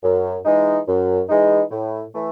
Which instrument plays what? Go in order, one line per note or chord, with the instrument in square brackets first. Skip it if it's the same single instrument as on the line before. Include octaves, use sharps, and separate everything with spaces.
[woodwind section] F#2
E3 G#3 D#4
F#2
E3 G#3 D#4
A2
E3 A3